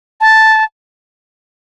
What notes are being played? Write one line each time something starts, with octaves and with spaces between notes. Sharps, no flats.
A5